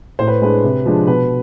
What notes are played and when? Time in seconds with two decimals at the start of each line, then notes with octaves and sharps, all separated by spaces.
0.19 A2 C5
0.27 B4
0.42 G#3 D4 B4
0.64 C3
0.86 F3 G#3 D4
1.07 B2 B4